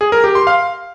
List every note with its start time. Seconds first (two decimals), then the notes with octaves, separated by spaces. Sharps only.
0.01 G#4
0.12 A#4
0.24 G4
0.35 C6
0.47 F5